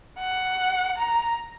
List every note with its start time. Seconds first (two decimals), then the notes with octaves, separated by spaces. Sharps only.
0.19 F#5
0.98 A#5